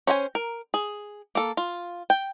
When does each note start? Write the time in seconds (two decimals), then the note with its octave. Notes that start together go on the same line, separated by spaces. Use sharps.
0.07 C#4 C5 F#5 G#5
0.35 A#4
0.74 G#4
1.35 A#3 A4
1.57 F4
2.10 G5